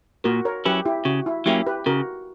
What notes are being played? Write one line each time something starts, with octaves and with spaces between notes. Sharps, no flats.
A#2 F#4 A#4
A#4 C#5
F#3 C#4 E4 G4 B4
E4 G4
C#3 F#4
E4
F#3 A#3 C#4 E4 G4
G4 B4
C#3 F#4 A#4